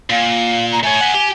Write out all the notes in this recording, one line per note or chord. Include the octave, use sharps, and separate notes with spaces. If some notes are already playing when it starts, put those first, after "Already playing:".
A#2 F5
A#5
A3 C#5 G#5
E5 F#5
G4